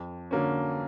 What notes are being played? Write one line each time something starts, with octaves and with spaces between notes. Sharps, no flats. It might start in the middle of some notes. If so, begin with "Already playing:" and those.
Already playing: F2
D3 F#3 A#3 C#4